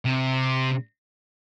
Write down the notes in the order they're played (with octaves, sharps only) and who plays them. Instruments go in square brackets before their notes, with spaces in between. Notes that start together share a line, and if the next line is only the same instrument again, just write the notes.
[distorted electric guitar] C3